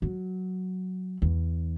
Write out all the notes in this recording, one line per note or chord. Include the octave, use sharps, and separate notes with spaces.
F#3
E2